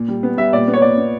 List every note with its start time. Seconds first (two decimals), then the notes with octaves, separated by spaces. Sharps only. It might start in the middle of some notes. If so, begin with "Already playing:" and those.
Already playing: A#2
0.08 G3
0.23 B3
0.37 G3 E5
0.53 A#2 D5
0.68 B3
0.74 C#5
0.82 A#2 D5
0.97 B3